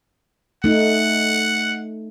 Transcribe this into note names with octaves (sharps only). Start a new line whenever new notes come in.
A3 D#4 F#5